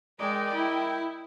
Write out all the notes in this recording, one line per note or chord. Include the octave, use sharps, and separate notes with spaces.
G#3 A#4 D5 D#5 G5
E4